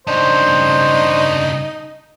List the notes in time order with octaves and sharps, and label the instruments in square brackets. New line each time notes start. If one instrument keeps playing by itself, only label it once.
[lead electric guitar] G2 C#3 [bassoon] D4 [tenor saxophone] D#4 [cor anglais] C5